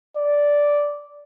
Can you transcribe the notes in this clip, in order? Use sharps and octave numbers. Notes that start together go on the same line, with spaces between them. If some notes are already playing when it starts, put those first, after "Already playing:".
D5